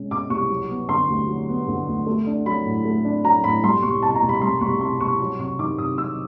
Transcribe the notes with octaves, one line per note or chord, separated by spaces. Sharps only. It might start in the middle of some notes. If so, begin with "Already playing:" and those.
Already playing: B2 G#3 C#4
B2 D6
C2 C#6
F#3
B3
D3 C6
D2
F#3
B3
D3
D2
A3
D4
F#3 B5
A2
A3
D4
F#3 A#5
A2 B5
G3 C6
C2 C#6
B2 A5
A#5
C2
B5
G3 C6
C2 C#6
B2 C6
C2 C#6
F#3 C#6
C3 C#6
D#3 D6
C3 D#6
F#3 E6